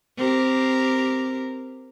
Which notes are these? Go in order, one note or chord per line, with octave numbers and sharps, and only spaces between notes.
C4 G4 A#4